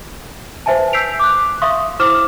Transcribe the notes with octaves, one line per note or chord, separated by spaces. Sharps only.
B4 C5 E5 G#5 A5
E6 G6 B6 C7 D7 F7
D6 F#6
E5 F5 C6 C#6 D#6
E4 C5 D6 F6 E7